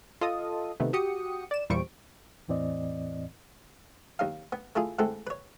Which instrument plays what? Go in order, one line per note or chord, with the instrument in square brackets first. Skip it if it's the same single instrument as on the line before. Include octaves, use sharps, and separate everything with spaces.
[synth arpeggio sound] F4 A4 D#5 D#6
C3 D#3 A3 B3
F#4 G4 D#6 C#7
D5 E7
E2 A#2 G3 C5 C#6 D7
[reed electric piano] E2 A2 E3 C4 D5 D#5
[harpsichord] D#2 D#4 F5
B3
A3 E4 F4 G#4
G#3 A3 C4 E4 A4 F#5
B4 C#5